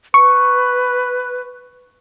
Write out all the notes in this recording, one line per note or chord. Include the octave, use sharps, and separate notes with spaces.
B4 C#6